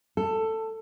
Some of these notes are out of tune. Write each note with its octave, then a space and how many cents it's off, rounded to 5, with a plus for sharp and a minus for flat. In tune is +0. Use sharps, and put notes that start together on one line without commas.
A4 +15